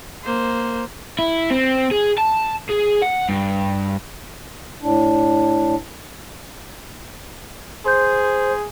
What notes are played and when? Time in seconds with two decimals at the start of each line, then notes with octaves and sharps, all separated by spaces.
0.24 A#3 C5
1.19 E4
1.50 C4
1.91 G#4
2.18 A5
2.70 G#4
3.02 F#5
3.29 G2
4.82 A2 D4
7.85 G#4 C5 C6 G6